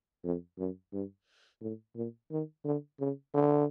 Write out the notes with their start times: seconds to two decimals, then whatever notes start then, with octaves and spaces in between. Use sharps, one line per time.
0.24 F2
0.58 F#2
0.93 G2
1.61 A2
1.96 A#2
2.31 D#3
2.65 D3
3.00 C#3
3.34 D3